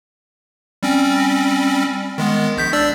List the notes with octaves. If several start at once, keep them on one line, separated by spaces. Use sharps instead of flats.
G3 C4 C#4
D#3 G#3 B3
A#1 G6 B6
D4 D5 E6